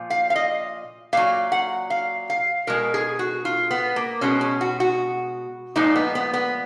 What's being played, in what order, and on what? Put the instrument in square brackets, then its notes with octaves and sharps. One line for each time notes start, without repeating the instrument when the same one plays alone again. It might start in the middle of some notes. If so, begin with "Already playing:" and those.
Already playing: [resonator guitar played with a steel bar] A#2 F3
F5
F5
D#5
A#2 F#3 F5
F#5
F5
F5
B2 G#3 A#4
G#4
F#4
F4
B3
A#3
B2 G#3 C#4
C#4
F#4
F#4
A#2 F3 G#3 D#4
B3
B3
B3